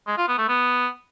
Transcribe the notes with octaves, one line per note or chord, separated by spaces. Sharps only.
G#3
F4
B3
A3
B3